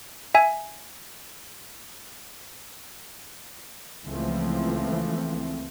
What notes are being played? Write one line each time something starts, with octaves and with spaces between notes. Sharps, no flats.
E5 G#5
C#2 E3 F3 A3 C4